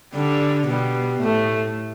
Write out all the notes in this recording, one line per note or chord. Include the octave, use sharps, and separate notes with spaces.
D3 G3
B2 G3
A2 A3